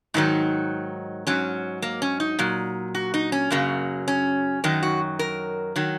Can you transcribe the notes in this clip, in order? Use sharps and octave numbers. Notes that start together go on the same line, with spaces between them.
G#2 D#3 F#3 D#4
G#2 F#3 C#4
A#3
C#4
D#4
A#2 F#3
F#4
D#4
C#4
F#2 C#3 F#3 A#3
C#4
F#2 D#3 F#3 D#4
F#4
A#4
D#3 F#3